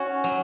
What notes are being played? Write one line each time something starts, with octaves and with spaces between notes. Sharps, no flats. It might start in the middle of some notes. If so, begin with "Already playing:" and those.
Already playing: C#4 F#4
F#3